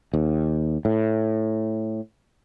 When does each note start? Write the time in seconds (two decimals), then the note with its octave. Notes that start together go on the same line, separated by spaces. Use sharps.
0.14 D#2
0.85 A2